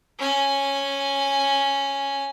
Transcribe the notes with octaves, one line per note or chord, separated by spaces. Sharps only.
C#4 G#5